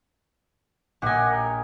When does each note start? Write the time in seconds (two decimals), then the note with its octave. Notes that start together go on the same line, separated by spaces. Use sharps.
1.02 A#1 G4 D#5 F#5 G#5
1.32 A#4